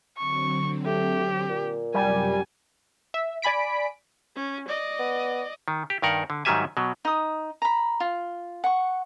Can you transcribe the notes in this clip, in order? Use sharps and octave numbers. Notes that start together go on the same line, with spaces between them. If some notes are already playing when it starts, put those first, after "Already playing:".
D3 F#3 C4 C#6
A3 G4
A#2
F#2 C3 F#3 G3 G#5
E5
D5 G#5 B5 B6 D7
C#4
D5 D#5
B3
D#3
G4
G2 D#3 A#4 F#5
D3
G#2 D#3 F#3 G3 E5 G#5
B2 F#3
D#4 D#6
A#5 B5
F4
F#5 C#6